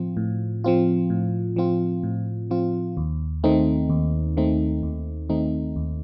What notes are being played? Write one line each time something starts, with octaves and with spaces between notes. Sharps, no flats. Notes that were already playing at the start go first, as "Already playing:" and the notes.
Already playing: A2 F3 C4 F4
A2
F3 C4 F4
A2
F3 C4 F4
A2
F3 C4 F4
D#2
D#3 A3 C4 D#4
D#2
D#3 A3 C4 D#4
D#2
D#3 A3 C4 D#4
D#2